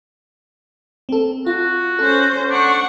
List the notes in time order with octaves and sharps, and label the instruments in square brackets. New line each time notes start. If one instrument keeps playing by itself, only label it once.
[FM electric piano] C4 A4
[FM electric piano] F4 [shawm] F#4
[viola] C#4 C5 [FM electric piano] A4
[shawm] D4 [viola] F#5 C#6